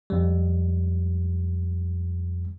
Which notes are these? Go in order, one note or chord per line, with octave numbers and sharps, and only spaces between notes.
F2 G3